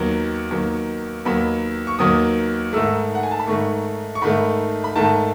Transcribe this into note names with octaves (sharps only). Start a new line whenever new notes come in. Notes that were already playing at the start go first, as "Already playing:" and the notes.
Already playing: D#2 D#3 F#3 B3
D#2 D#3 F#3 B3
D#2 D#3 F#3 B3 B5
C#6
D#2 D#3 F#3 B3 D#6
G#2 D#3 A3 E6
F#5
G#5
A5
B5
G#2 D#3 A3 C#6
C#6
G#2 D#3 A3 B5
B5
G#2 D#3 A3 A5